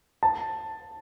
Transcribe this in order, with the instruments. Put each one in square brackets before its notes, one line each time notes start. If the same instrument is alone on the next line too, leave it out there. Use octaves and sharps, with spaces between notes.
[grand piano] A5